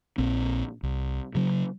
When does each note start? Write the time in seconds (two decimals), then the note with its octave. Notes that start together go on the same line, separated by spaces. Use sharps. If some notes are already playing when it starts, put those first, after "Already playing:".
0.18 A#1 C4
0.83 C2
1.35 C#3 F#3